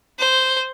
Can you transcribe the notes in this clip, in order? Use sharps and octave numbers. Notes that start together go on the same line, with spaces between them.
C5